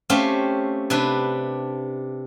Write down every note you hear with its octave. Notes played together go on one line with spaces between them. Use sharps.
A3 C4 C#4 G4 F5
C3 D4 B4